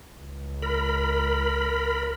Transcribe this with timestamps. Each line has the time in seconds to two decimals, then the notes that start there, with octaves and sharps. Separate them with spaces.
0.16 C#2
0.62 A#4 B5